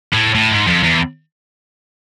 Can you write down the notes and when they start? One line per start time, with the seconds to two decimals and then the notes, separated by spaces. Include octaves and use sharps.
0.13 A2
0.35 A2
0.51 G#2
0.67 F2
0.83 E2